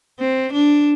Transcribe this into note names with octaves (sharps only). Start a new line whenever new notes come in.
C4
D4